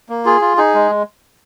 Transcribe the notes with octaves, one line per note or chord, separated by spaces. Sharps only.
A#3
F4 G#4
F4
D#4 G#4
G#3